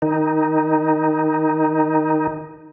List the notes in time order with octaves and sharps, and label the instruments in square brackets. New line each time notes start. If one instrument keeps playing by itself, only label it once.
[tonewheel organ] D#3 D#4